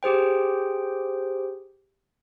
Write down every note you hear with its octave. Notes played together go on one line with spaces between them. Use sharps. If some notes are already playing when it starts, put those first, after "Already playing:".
G4 G#4 C5 G5